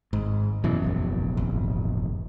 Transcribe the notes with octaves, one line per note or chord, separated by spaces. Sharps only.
G#1 G#2
F#2 B2 E3
F1 A#1 E2
G#1